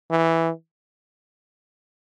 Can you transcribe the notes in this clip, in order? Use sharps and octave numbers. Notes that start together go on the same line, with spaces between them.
E3